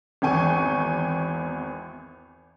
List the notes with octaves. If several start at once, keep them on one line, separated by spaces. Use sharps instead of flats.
G#1 E2 G5 G#5 C#6